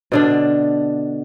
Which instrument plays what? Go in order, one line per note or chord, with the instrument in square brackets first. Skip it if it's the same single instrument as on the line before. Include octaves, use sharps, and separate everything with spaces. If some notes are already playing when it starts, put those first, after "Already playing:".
[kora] B2 D3 D4